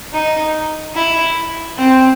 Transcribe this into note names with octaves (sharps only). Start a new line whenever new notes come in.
D#4
E4
C4